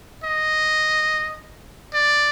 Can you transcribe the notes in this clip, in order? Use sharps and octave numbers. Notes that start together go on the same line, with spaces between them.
D#5
D5